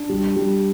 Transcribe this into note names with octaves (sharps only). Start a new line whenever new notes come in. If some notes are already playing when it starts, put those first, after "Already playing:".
Already playing: D4
G3
G3